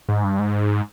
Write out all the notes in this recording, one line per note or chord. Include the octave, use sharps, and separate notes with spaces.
G#2
G2
G#2